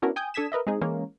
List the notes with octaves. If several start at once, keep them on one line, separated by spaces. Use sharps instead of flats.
B3 C#4 D4 E4 F#4 A#4
G5 G#5 D#6 G6
D4 A4 D#6 G#6 B6 E7
A#4 B4 D#5 E5
G#3 C4 D#4 G#4
E3 G#3 A#3 C#4 A#4